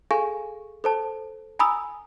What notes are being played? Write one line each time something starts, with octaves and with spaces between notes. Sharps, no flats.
G#4 A4 F5 G#5 C#6
A4 C5 A5
G#5 A#5 B5 D#6 E6